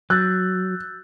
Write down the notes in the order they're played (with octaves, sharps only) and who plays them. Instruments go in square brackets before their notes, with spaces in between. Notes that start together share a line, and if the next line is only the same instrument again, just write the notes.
[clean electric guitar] F#3 [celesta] E6 G6 A6 [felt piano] F#6